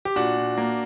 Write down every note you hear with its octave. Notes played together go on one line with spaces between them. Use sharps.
G4
A#2 D4 F#4
A#2
A#3